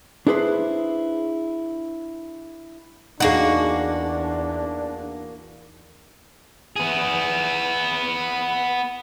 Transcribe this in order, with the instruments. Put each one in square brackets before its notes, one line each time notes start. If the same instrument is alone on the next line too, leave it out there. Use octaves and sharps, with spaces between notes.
[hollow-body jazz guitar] D4 E4 G#4 A4 B4 C5
[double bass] E2 [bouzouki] A#3 F#4 [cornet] D4 [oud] D#4 G#4
[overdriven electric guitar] B3 G#4